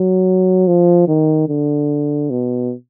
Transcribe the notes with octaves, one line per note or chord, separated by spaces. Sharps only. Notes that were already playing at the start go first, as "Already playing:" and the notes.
Already playing: F#3
F3
D#3
D3
B2